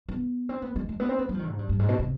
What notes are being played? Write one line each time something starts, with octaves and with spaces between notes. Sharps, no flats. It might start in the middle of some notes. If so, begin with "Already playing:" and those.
B3
C4
B3
G#3
G#3
B3
C4
B3
G3
F3
D#3
G#2
G2
G2
G#2
B2
C3